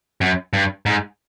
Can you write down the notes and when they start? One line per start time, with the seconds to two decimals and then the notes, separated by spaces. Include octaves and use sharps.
0.21 F#2
0.53 G2
0.86 G#2